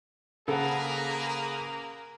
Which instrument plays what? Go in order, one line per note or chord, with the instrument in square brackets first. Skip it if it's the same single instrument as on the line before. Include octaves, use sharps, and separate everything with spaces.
[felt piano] C#3 C5 [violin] A#3 [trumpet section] G#4 B4 [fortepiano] A4 F#5